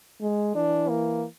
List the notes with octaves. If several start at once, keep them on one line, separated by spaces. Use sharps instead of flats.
G#3
E3 D4
A#3